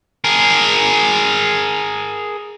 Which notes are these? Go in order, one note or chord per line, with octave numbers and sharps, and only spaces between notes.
G#4 A#4